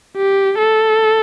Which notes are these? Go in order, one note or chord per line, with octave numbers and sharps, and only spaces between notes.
G4
A4